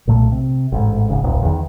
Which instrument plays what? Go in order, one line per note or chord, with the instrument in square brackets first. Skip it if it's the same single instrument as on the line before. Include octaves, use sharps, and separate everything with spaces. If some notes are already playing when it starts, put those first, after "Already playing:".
[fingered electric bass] B1 A#2 A3
C3
A1 G#2
G#1 C#3
D#1 B1
E2 D3 D#3